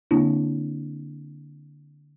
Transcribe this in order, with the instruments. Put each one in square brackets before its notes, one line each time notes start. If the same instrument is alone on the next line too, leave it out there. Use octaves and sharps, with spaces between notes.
[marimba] D3 A#3 C4 D4 E4